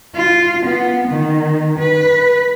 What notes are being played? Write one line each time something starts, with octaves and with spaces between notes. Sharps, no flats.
F4
B3
D#3
B4